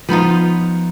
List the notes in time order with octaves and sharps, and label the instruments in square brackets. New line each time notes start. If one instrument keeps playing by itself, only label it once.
[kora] F3 B3 D#4 F4